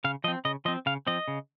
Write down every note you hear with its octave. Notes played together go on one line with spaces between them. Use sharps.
C#3 F5
F3 C4 D#5
C#3 D#5
F3 C4 D#5
C#3 F5
F3 C4 D#5
C#3